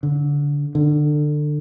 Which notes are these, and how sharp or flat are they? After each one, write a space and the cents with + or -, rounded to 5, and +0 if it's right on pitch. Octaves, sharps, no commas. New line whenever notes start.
D3 -20
D3 +20